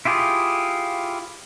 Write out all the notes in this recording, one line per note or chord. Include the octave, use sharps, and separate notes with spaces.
E4 F4 G4 G#4